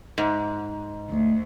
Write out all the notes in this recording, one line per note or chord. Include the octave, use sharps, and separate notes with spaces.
G#2
D2